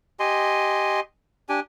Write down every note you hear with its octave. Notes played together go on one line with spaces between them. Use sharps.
G4 D#5 G#5 C6
D4 G4 G#5